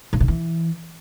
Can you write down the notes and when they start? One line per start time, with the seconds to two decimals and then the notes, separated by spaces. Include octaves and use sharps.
0.13 A2
0.20 C3
0.28 E3